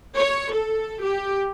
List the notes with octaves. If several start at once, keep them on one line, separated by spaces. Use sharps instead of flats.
C#5
A4
G4